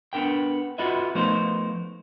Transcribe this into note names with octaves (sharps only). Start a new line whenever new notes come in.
B3 D4 A#4 G5
F4 F#4 A4 B4 D#5 E5
F3 A3 B3 D#4 A#4 C5